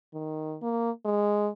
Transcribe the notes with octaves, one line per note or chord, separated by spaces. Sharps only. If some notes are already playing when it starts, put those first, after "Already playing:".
D#3
A#3
G#3